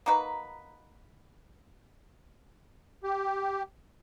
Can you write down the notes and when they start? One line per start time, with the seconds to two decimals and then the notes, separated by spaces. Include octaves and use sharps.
0.06 A#3 D#4 F#4 B4
3.04 G4